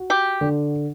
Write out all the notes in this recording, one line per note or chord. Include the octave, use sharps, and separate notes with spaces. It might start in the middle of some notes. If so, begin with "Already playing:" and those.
Already playing: F#4
G4
D3